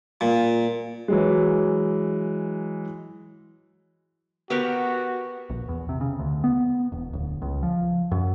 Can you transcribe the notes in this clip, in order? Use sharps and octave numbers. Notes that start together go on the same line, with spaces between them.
A#2
E3 F#3 G#3
B3 F#4 G4 A#4
A#1
E2
C3
C#3
D2
B3
E1
D1
C#2
F3
F#2